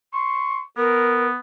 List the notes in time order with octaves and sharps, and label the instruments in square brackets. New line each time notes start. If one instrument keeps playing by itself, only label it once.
[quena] C6 [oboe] C#6
[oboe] B3 [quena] A#4